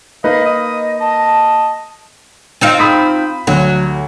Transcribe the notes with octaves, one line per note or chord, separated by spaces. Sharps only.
A#3 D#4 B4 D#5 F5
D#5 D#6
D#5 A5
C4 D#4 F4
B5 D#6 B6
D2 F#3